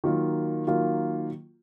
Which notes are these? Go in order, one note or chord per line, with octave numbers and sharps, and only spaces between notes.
D#3 F#3 A#3 F4
D#3 F#3 A#3 F4